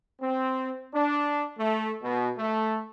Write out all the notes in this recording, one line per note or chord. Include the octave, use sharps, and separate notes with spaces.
C4
D4
A3
B2
A3